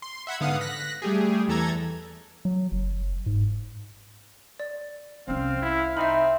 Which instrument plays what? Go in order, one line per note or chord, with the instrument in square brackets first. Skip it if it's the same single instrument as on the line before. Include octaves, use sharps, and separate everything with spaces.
[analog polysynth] C6
E5 F#5 B5 G#6
G#2 D3 B3 F5 F#5 D#6
F#6 A#6 B6
G3 A3 G4 G#4
E2 E3 A4 A#5 G#6
[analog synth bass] F#3
F#1
G#2
[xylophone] D5
[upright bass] C2 C#4 [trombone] C4 [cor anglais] F5
[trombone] E4
[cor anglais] C4 [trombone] D#4 [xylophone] E5 B5